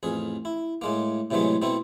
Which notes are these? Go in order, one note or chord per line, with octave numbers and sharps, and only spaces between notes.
A1 F2 G#4
E4
A2 G#3 A#3
A2 C3 E3 F#3 G#3 A3
B2 A3 C4 E4